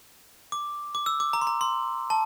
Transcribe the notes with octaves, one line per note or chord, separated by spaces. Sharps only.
D6
D6
E6
D6
A#5
C6
A#5
C6
A5